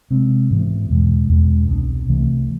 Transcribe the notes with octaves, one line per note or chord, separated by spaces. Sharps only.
C3 G#3 C4
G#2 E3 B3
E2 B2 G#3
E2 B2 G#3
C2 B2 B3 D4
C2 C3 E3 A3